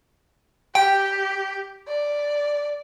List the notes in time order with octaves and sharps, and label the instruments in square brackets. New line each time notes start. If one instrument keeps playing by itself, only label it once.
[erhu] G4 [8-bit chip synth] G5
[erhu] D5